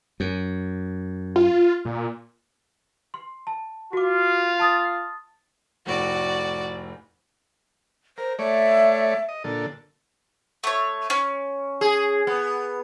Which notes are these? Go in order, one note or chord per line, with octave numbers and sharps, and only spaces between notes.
F#2
F4
A#2
C6
A5
F4 F#4 D6
A5 D#6 A6
F1 A2 F#4 D5
A#4 C5
A3 C#5 D5 E5
D#5
A#2 D3 A4
A3 C#5
C#4
G#4
B3